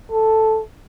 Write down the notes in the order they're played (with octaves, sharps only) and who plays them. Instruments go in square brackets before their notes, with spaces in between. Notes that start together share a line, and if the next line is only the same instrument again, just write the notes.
[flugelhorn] A4